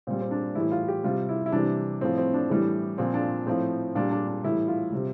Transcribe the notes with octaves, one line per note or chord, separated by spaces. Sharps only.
A#2 G3 C4
C4
D4
A2 E3 G3 E4
F4
G4
C3 G3 F4
E4
E4
C3 E3 G3 D4
A2 F3 C4
C4
D4
A2 E3 G3
A#2 F3 C4
D4
A2 F3 C4
A#2 G3 D4
D4
D4
A2 E3 G3 E4
F4
C3 G3